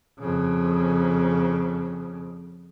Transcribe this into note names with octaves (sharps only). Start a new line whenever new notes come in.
F2 C#3